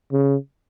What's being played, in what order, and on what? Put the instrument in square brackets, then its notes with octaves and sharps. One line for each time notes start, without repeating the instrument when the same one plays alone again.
[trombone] C#3